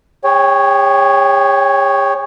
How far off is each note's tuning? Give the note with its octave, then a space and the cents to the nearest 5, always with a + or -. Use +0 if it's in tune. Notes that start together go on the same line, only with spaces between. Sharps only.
G#4 -45 C#5 +0 G5 +0